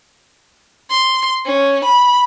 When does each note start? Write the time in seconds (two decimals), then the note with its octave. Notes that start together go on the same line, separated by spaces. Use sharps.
0.90 C6
1.45 C#4
1.84 B5